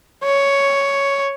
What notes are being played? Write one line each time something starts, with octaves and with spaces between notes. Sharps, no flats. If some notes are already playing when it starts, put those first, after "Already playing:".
C#5